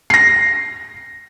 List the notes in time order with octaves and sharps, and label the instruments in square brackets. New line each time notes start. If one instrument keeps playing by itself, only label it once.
[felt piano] A#6 C7